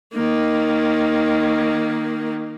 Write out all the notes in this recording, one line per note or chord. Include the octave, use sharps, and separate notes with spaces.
D#3 A#3